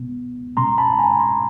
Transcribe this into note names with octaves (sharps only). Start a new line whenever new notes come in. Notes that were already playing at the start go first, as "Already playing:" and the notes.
Already playing: B2 G#3 B3
B2 G#3 C#4 A#5 C6
A5 B5
G#5 A#5
A#5 C6